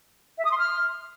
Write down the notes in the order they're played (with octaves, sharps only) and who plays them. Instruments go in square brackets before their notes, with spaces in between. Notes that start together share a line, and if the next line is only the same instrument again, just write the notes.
[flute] E5
D#6
C6
F6